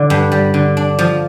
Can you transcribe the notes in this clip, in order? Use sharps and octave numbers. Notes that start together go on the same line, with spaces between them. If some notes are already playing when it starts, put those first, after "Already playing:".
Already playing: D3
G2
G3
D3
D4
F3